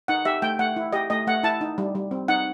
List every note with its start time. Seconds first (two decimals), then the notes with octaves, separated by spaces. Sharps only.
0.08 D#4 F#5
0.25 G4 E5
0.42 A3 G5
0.59 A3 F#5
0.76 E4
0.93 G4 D#5
1.10 A3 D#5
1.27 A3 F#5
1.43 E4 A5
1.61 D#4
1.78 G3
1.95 G3
2.11 C4
2.28 D#4 F#5